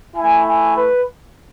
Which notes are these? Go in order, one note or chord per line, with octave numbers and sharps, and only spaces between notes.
A3 E4 G#5
G#5
B4